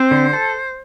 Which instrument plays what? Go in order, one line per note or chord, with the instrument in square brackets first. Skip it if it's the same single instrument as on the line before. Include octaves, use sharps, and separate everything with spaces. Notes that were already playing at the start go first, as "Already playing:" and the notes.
Already playing: [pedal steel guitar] C4 [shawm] C5
[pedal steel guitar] D3
A4